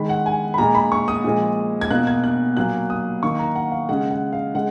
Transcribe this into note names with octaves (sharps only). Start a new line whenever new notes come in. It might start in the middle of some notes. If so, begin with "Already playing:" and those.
Already playing: D#3 G#3 B5
F#5
G#5
B5
A#2 G#3 A#5
B5
C#6
D#6
A#2 F3 G#3
G#6
B2 A#3 F#6
G#6
F#6
A#2 F#3 A#3 F#6
D#6
D#3 A#3 C#6
A#5
F#5
F5
C#3 G#3 F#5
F#5
F5
C#3 G#3 F#5